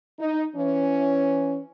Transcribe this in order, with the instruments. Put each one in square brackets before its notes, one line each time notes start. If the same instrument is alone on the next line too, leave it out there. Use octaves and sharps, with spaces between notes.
[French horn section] D#4
E3 C#4